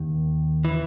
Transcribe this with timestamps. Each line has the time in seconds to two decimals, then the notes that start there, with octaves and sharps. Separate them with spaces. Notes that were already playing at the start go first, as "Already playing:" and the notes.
Already playing: D#2 D#3
0.65 E3